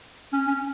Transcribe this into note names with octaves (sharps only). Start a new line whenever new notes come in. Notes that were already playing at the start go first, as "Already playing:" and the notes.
C#4
C#4